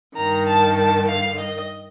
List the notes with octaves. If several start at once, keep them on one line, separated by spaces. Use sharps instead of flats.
G2 D#3 A#5
A5
A5
F5
D#5